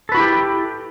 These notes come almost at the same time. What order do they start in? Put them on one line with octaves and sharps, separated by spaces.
A4 B4 F#4 E4 G4